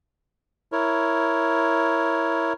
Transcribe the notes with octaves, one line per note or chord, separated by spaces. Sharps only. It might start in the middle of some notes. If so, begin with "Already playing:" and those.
E4 A#4 C#5